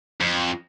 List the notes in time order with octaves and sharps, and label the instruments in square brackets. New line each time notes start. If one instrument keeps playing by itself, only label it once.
[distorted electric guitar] F2